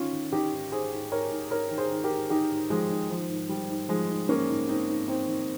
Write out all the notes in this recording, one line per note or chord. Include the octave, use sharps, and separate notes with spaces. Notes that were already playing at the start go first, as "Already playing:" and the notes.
Already playing: D#3 C#4 F4
D#3
D#3 D#4 G4
G#2
G#2 G#4 C5
G#2
G#2 A#4 C#5
G#2
G#2 A#4 C#5
D#3
G#4 C5
D#3
G4 A#4
G#2
D#3 D#4 G4
G#2
D#3 F3 G#3
D#3
D#3 F3
G#2
D#3 G3
G#2
G#2 F3 G#3
G#2
G#2 A#3 C#4
G#2
G#2 C4 D#4
G#2
G#2 C4 D#4
D#3